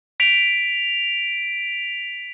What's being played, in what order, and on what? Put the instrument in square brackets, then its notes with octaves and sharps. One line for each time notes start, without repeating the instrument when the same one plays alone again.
[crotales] B6 D7 F7